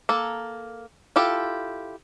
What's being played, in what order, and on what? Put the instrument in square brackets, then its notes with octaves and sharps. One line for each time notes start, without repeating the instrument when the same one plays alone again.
[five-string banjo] A#3 A4
E4 F4 G4 A4